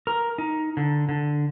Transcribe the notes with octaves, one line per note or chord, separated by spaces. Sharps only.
A#4
D#4
D3
D3